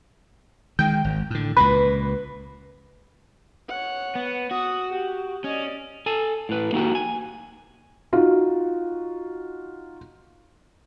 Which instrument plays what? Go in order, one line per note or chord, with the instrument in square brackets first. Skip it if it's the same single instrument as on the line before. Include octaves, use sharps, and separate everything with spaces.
[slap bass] D#3 G#3 [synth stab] G5
[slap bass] G#1
A2 D3
[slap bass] C#2 A#2 [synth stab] B4
[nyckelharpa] C#5 F#5
[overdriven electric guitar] B3
[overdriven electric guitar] F#4 [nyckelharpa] D#6
[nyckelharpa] G4
[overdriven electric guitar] C#4 [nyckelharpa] D5 D#5
[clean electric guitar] A4 G#5
A2 B4
A#3 D#4 F#4 G4
G#5
[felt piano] D#4 F4 F#4